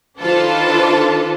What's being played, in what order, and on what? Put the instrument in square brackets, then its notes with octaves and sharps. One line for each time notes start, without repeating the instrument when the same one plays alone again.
[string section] D#3 D4 F4 A4 B4 C5